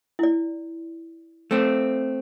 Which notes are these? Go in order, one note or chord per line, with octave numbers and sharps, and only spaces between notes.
E4 D5
A3 C4